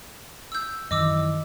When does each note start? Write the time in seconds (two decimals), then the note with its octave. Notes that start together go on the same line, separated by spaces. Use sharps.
0.52 E6 G6
0.91 F#2 D#3 E3 D#5 D6 E6